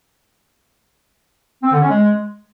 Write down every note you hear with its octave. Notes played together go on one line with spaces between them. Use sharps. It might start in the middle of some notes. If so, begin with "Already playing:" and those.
C4
D3
C#4
G#3